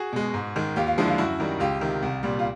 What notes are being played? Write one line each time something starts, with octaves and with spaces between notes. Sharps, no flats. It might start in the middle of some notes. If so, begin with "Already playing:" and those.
Already playing: F#4 G#4
B2 G#3
G#2
D#3 G#3
D#2 F4 G4
F4
D3 F3 G#3 E4
F4
F#2 E4 F#4
D#3 G3
C#2 F4 G4
C3 D#3
C2
A#2 G3
F4